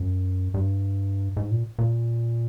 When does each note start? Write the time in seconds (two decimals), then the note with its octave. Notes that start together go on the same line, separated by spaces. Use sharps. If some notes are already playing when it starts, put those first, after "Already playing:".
Already playing: F#2
0.54 G2
1.37 G#2
1.51 A#2
1.79 A#2